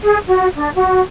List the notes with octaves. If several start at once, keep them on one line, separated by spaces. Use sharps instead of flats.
G#4
F#4
D4
F#4